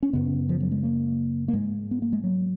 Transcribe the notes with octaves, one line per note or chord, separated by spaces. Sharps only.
C#4
F#2 C#3 B3
F3
F#3
G#3
A#3
A#3
G#2 G#3
B3
A#3
G#3
F#3